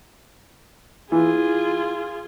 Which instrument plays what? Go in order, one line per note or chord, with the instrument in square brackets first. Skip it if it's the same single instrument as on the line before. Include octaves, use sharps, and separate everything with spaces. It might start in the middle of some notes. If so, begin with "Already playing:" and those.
[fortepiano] E3 [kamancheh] F4 G#4